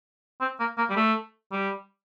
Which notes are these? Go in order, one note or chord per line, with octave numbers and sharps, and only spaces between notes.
C4
A#3
A#3
G3
A3
G3